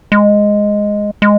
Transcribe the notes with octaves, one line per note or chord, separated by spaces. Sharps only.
G#3
G#3